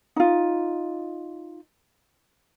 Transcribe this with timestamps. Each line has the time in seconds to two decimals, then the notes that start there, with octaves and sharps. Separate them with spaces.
0.16 D#4 F4